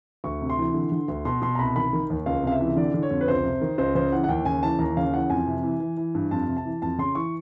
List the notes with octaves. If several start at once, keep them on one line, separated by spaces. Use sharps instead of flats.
D2 C#6
C3
C6
E3
D3
D3
D2
B2 C6
B2 C6
A#5
C2 B5
D#3 B5
D#3
D#2
C#2 F5
C3 F5
E5
E3
D3 D5
D3
C#5
F2
B4
C#2 C5
C3
D#3
C#2 C5
C#3 C5
E3 F#5
F#5
D#2 G5
C#3 G#5
E3 A5
D#2 A#5
C#3 F5
E3 F#5
F2 G#5
C3
E3
E3
E3
G2
F2 A5
C3
A5
E3
F2 A5
C#3 C6
E3 C#6